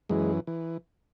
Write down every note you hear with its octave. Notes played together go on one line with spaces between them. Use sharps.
F#2 E3 G#3
E3